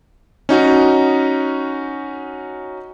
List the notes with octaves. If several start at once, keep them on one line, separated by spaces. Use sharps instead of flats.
C#4 D#4 F#4